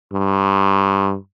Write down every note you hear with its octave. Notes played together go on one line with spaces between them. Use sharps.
G2